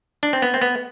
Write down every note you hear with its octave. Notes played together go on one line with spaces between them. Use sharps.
D4
C4
B3
C4
B3